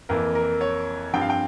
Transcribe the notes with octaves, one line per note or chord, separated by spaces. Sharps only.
F2 E3 A#3 A#4
A#4
C#5
G2 F3 C4 G5
F5
G5